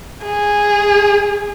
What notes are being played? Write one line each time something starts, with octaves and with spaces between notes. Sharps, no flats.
G#4